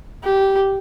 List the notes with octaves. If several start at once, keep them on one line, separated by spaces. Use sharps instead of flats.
G4